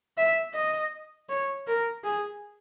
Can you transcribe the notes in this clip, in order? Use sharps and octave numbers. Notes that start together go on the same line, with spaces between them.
E5
D#5
C#5
A#4
G#4